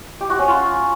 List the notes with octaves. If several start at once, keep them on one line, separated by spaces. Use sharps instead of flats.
G4
F#4
C#4
F4